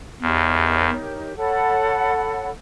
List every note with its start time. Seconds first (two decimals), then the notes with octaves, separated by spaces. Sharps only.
0.22 E2 D#4 G4 A#4 C#5
1.36 A4 C#5 F#5 B5